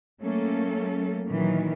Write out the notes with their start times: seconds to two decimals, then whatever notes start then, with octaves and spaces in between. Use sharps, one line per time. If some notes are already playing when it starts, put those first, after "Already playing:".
0.21 F#3 A3 A#3 C#4 A4
1.27 A#2 D#3 E3 F#3